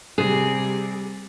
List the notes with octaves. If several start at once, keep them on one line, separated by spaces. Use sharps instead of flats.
C3 G3 G#4